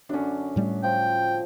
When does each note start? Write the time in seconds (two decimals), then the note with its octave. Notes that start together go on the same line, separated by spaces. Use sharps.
0.09 F#2 D3 C#4 D4
0.56 A2 G3 A3
0.84 F3 G5